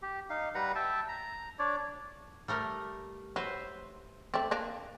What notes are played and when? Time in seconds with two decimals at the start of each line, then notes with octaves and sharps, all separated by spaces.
0.02 G4
0.30 D#4 F5
0.55 G3 B4 F#5 A#5
0.75 E5 G5 A5
1.08 A#5
1.59 D4 C#5 D5
2.48 G3 A3 A#4
3.36 F#3 B4 C5 E5
4.34 A3 C4 D5
4.51 A#3 D4